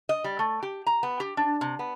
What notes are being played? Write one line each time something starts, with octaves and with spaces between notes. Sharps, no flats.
D#5
G3
A3
G4
A#5
B3
G4
D4
C3
B3